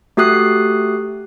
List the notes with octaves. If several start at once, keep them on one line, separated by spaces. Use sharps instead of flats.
A3 F#4 G4 D#6 F#6 C7